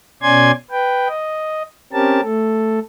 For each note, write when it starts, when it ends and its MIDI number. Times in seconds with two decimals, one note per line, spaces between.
0.22 0.51 47
0.22 0.51 61
0.22 0.51 74
0.22 0.51 80
0.22 0.51 84
0.22 0.51 92
0.71 1.08 71
0.71 1.08 79
1.08 1.62 75
1.93 2.21 60
1.93 2.21 61
1.93 2.21 67
1.93 2.21 70
1.93 2.21 81
2.22 2.80 57
2.22 2.80 69